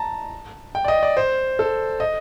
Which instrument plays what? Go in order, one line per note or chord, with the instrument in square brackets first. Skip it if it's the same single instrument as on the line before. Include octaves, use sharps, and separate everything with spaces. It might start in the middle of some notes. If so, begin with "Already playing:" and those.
Already playing: [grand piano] A5 A#5
G5
D5
D#5
D5
C5
A4
D#5